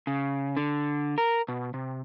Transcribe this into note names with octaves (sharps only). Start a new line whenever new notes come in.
C#3
D3
A#4
B2
C3